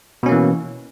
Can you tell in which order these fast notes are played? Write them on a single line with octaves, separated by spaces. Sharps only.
B2 C#4 A#3 E3